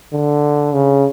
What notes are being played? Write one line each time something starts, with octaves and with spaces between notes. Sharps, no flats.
D3
C#3